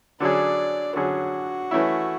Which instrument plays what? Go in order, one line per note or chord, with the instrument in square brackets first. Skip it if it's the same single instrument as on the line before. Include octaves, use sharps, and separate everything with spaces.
[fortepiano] D3 F#3 C#4 G#4 [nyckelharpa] D5
[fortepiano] D3 F#3 C#4 G#4 [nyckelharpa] F#4
[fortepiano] E3 A3 C#4 E4